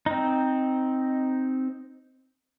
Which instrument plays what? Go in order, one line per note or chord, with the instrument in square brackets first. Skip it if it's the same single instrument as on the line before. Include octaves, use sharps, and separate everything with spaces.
[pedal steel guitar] C4 D#4